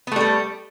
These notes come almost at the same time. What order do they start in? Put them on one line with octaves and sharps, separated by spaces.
B3 A3 G3 A4